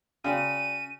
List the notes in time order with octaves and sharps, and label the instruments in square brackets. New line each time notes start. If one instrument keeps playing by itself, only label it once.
[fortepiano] C#3 [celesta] F#4 D5 G5 [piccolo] D#7